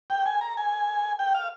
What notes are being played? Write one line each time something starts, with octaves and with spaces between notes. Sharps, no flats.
G5
G#5
A#5
G#5
G5
F5